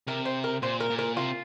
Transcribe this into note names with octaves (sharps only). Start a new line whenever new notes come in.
C3 A#4
C5
A#4
A#2 C5
A#4
A#2
A#4
C3 F4